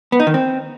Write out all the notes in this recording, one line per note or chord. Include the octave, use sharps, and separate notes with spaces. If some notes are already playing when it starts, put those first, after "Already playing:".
B3
D#4
D#3
C4